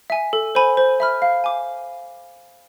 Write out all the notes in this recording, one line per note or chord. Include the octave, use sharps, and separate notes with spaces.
E5 G#5
A4
C5 G#5 B5
C5
E5 B5 F6
F5
G#5 D6